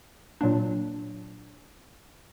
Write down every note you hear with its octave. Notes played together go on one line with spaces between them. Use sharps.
A#2 F#3 A#3 D4